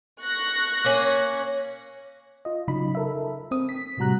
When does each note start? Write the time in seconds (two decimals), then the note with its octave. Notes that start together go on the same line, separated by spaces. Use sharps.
0.21 C#6 F#6 A#6
0.85 A#3 C#4
2.45 F4 D#5
2.68 C#3 F#3 D#4 B5
2.95 A4 A#4 E5
3.51 C4 D#6
3.69 B6
3.97 A2 C3 G3 F#4 A#5 F#6